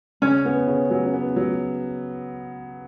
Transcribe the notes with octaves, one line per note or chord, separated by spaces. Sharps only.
C#3 C#4
B3
C#3
F#3
B3
F#3